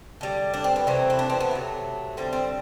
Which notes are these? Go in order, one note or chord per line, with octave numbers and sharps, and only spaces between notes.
D3 G3
D4
C4
B3
C3 E3 A3 C4
E4
D4
C4
B3
C3 F#3 A3
D3 G3 C4
C4